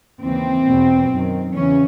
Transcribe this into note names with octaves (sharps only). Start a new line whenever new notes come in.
D#2 C#3 E3 C4
E2 B2
F#2 D#3
E2 C#3 E3 C#4